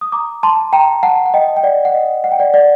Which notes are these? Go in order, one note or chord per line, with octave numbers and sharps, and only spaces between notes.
D#6
A#5 D6
A5 C6
G5 A#5
F#5 A5
F#5
D#5 G5
G5
D5 F#5
F#5
D#5
F#5
G5
D5 F#5
D5 F#5